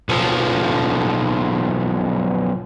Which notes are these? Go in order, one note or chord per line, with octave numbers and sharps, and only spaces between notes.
B1 F3